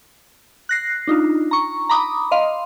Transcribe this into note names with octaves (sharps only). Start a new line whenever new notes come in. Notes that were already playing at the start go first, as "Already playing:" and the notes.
F#6 A#6 C7
D4 D#4 F4
A#5 C#6
A#5 B5 D6 D#6
D#5 F5 C6